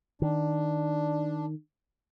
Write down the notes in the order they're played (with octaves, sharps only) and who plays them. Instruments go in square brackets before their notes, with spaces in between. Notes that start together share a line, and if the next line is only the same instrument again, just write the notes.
[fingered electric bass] D#3 [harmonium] D4